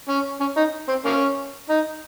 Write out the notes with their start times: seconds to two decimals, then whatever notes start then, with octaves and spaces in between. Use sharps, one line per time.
0.09 C#4
0.41 C#4
0.57 D#4
0.89 C4
1.05 A#3 C#4
1.70 D#4